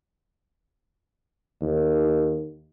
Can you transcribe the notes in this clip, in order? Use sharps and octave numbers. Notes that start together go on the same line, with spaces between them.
D#2